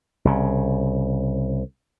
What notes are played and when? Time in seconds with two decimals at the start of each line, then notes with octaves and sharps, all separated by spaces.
0.25 C2 C#3